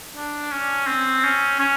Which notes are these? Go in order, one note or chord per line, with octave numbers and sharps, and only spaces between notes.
D4
C#4
C4
C#4
C#4